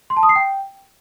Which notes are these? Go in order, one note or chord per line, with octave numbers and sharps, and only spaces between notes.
C6
A5
D#6
C7
G5